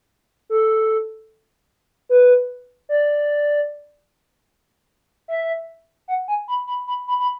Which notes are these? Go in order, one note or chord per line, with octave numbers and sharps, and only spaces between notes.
A4
B4
D5
E5
F#5
G#5
B5
B5
B5
B5
B5